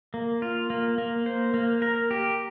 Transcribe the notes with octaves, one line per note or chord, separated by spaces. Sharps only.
A#3
F4
A#3
A#3
C5
A#3
A#4
G4